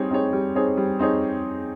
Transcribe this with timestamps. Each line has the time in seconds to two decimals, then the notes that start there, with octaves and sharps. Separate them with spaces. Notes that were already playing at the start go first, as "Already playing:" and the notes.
Already playing: G3 C4 D#4 G#4 C#5
0.10 C4 D#4 G#4 C#5
0.33 G3
0.55 C4 D#4 G#4 C#5
0.77 G3
0.99 C4 D#4 G#4 C#5